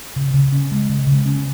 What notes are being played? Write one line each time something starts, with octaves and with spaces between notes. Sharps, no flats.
C#3
C#3
C#4
G#3
C#3
C#3
C#4